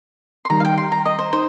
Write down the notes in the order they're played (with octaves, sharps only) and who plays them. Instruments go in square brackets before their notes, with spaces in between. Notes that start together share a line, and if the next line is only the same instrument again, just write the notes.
[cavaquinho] C6
[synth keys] D#3 G3 D#4 [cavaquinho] A#5
[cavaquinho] F5
G5
C6
A#5
D#5
C5
[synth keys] D#4 [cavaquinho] C5